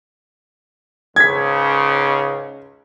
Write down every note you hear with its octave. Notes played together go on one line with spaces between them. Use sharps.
C#2 G#2 C#3 G#6 B6